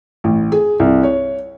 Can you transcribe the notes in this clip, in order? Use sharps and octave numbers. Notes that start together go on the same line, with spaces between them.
A1
G#4
C2
C#5